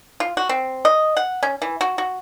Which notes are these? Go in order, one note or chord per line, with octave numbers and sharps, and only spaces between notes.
F4
F#4
C4
D#5
F#5
C#4
E3
F#4
F#4